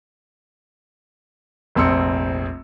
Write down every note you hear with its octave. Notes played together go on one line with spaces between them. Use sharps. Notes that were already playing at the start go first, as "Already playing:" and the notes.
F1 A#1 C4 C6 E6 C#7